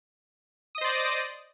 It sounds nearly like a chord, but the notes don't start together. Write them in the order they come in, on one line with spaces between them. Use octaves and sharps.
D#6 D#5 C5 D5